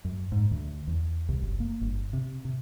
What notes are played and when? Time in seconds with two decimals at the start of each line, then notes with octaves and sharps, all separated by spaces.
0.05 F#2
0.32 G#2
0.51 D2
0.87 E2
1.29 C2
1.42 F#1
1.60 A#3
1.81 G1
2.13 C3
2.45 C3